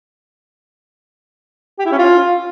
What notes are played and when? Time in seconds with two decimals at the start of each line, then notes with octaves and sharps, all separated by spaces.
1.79 G4
1.86 E4
1.92 C#4
1.98 F4